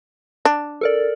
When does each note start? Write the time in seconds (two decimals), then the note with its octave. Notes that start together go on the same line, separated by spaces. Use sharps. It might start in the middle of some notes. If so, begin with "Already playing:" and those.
0.45 D4
0.81 A4 A#4 D5